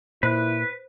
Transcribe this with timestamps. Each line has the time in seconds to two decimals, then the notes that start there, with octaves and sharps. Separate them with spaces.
0.23 A#2 E4 B4 C5